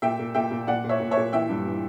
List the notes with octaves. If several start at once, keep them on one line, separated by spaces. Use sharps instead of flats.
A#2 E5 G5
A#2
A#2 E5 G5
A#2
A#2 D5 F#5
A#2
C#5 E5
A#2
C#5 E5
A#2
E3 E5 G5
G2
E3